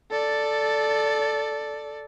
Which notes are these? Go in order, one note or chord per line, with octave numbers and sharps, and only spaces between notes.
A4 D5